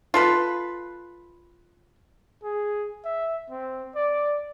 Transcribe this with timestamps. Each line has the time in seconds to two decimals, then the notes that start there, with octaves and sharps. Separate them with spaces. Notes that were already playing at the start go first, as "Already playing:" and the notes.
0.14 F4 A4 B4
2.43 G#4
3.05 E5
3.50 C4
3.96 D5